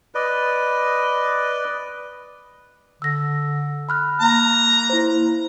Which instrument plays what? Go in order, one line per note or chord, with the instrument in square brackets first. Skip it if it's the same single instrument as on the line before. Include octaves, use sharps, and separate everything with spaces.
[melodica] B4 D5 D#5
[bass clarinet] D3 [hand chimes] E6 A#6
[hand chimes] B5 F6 F#6
[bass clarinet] A#3 [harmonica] A#5
[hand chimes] E4 C5